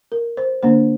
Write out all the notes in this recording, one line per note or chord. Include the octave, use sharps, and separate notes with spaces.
A#4
C5
D3 A#3 D4 C5